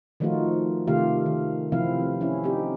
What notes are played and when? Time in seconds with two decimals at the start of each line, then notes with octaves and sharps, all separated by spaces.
0.20 D#3 F3 A3 D#4 F4 F#4
0.87 C3 D#3 A3 F4 G4 F5
1.26 D#3
1.72 C3 E3 F3 C4 E4 F5
2.21 C#4 E4
2.44 C4 D#4 G4